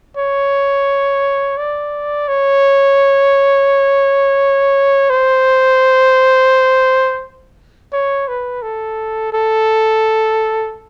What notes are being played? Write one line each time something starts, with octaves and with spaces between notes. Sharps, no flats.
C#5
D5
C#5
C5
C#5
B4
A4
A4